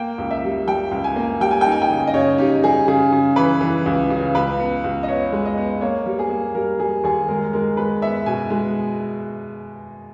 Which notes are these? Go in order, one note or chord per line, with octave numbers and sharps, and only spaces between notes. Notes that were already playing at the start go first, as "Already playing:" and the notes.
Already playing: A#3 G5
C#2
E5
G3
G3 G5
C#2
G#5
A#3
G3 G5
G#5
D#4 G5
G#5
G5
C#3
D#5
C#3 C#5
D#4 G4
G3 G#4
C#3 G#4
C#3
E3 B4
E3
C#2
C#3
C#2 B4
B3
C#2
D#5
B3 C#5
G#3
D#5
B3
A#3 C#5
G3
G#4
A#3
G3 A#4
G3 G#4
D#2 G#4
G#3 A#4
G#3 A#4
G#3 B4
B3 E5
B2 G#5
G#3